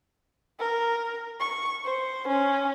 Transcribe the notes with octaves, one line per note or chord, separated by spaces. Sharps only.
A#4
C#6
C5
C#4